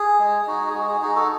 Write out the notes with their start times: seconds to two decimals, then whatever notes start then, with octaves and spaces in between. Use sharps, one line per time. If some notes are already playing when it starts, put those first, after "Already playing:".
Already playing: G#4
0.19 G#3
0.47 D#4 F#4
0.69 G#4
0.75 G#3 F#4
0.88 G#4
1.02 D#4 F#4 G#4
1.16 F#4 A4